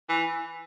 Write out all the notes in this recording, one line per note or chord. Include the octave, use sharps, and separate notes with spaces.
E3